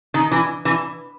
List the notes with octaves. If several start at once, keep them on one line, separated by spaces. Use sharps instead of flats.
D#3
E3
E3